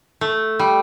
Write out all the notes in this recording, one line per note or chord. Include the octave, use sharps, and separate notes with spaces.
A3
G3